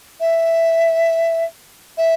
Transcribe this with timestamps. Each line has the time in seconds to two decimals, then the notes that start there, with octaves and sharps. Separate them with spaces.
0.20 E5
1.97 E5